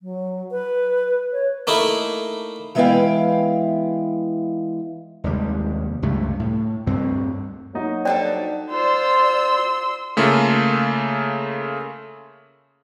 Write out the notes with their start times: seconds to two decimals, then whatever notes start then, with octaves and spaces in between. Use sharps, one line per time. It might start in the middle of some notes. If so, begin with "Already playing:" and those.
0.01 F#3
0.52 B4
1.33 C#5
1.67 A3 A#3 D#4 E4
2.75 E3 G#3 B3 E4 F5 G5
5.24 F1 D#2 G3 G#3
6.02 C#2 G2 C3 A3
6.39 A2
6.87 D2 G2 C4
7.74 F#3 A#3 D#4 F#4
8.05 G3 D4 A4 C5 D5 G5
8.71 F4 C5 D5 C6 E6
10.17 C#3 A3 A#3 F4 A4